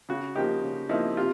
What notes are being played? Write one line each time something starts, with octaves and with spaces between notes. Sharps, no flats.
C#3 F#4
F3 A#3 D#4 G4
C#3
F3 A#3 D#4 E4
C3 F4